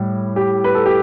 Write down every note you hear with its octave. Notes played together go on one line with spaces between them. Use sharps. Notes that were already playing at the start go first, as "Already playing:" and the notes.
Already playing: A2 G3
G4
B4
A4
G4